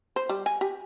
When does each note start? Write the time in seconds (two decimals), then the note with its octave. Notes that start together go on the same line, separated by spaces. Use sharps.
0.16 C5
0.29 G3
0.46 G#5
0.61 G4